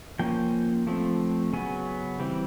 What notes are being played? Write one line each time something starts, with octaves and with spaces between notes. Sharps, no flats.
F3 A#3 C#4 G5
F3 A3 C4
C#3 F#3 B3 G#5
E3 G3 C4